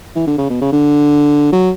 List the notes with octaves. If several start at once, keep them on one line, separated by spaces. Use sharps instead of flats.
E3
D3
C#3
B2
C#3
D3
F#3